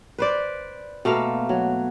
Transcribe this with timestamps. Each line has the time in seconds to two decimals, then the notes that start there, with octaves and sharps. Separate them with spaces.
0.18 B4 C5 D5
1.05 B2 A3 A#3 F5
1.49 F#3